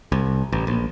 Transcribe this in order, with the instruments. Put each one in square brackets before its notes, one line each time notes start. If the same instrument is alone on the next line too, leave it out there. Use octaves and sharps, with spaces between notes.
[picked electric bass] C2
A1
A#1